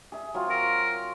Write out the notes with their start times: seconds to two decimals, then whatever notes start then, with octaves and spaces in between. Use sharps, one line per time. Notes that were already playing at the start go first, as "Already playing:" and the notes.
0.12 G#4 E5
0.34 F#3 C4 F4
0.50 A#4